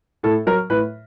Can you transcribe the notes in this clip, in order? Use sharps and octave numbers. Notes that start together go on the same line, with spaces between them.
A2 A4
F#3 A#4
A2 B4